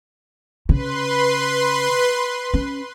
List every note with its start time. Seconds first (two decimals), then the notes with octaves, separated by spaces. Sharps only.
0.69 C#3 B4 C6
2.54 C#4